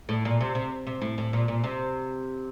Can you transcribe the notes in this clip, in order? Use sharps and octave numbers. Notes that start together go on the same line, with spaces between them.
A2
A#2
C3
C3
C3
A2
A2
A#2
A#2
C3